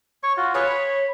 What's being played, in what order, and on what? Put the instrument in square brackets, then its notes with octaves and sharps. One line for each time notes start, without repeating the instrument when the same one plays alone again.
[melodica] C#5 C#6
F4 F#4
[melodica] F4 G#4 B4 [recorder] C#5
[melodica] B5